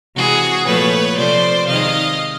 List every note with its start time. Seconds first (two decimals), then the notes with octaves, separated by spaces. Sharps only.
0.16 C3 E3 G#3 F#4 G#4
0.67 A#2 F3 A3 B4 C#5
1.18 C3 F3 A3 C5 D5
1.68 C3 D#3 G#3 D#5 F5